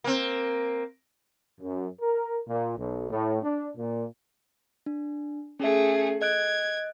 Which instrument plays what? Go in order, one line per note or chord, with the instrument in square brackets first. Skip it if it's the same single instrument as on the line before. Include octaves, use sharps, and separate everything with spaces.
[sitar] A#3 C4
[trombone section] F#2
A#4
A#2
B1
A2
D4
A#2
[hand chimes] D4
[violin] A3 G#4 [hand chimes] C#4 E5
[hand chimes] D#5 F#6 D7 [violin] G#6